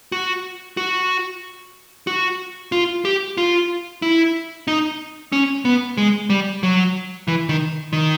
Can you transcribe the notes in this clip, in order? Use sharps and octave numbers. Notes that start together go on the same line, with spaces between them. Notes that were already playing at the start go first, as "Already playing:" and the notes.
F#4
F#4
F#4
F4
G4
F4
E4
D#4
C#4
B3
G#3
G3
F#3
E3
D#3
D#3